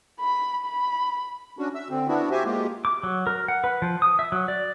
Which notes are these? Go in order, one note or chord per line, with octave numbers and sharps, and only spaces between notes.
B5
B5
C#4 D4 F#4
E5 E6
D3 C4
B3 D4 E4 F#4
F#4 G4 C5 E5 G#5
G#3 A#3 F4 G4
D6
F#3
A#4
F#5
B4
F3
D#6
E5
F#3
D5